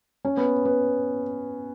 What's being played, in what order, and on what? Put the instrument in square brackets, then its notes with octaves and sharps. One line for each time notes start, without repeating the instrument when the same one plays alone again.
[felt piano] C#4
B3
B3